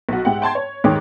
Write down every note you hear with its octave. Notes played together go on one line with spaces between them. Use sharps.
B1 F#4
G#2 G4 E5 F#5
G5 A5 C6 G#6
C#5
D#2 G#2 D#3 G#4 C#5 D6